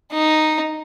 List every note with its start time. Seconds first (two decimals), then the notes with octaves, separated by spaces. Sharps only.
0.12 D#4